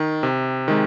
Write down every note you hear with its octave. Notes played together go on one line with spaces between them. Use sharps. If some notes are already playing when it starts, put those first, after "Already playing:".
Already playing: D#3
C3
D#3 G#3